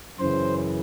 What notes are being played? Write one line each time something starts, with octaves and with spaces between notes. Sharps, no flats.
F#2 C#3 E3 C5